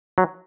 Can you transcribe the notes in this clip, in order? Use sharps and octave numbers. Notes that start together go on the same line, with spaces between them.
F#3